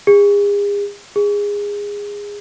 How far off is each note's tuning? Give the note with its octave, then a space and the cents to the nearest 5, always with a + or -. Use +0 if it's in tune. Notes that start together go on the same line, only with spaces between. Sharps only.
G#4 -40
G#4 -20